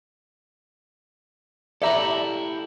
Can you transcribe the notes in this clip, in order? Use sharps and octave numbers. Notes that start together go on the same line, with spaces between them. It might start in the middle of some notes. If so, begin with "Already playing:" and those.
E4 G4 A4 D5 E5 A#5